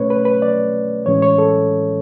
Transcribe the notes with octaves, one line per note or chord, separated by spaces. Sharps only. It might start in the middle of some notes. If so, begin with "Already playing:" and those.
Already playing: B2 A3 C#4 B4 C#5
B4
B4
D5
A2 E3 G#3 C#4 C#5
C#5
A4